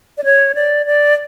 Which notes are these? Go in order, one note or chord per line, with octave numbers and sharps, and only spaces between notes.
D5
C#5
D5
D5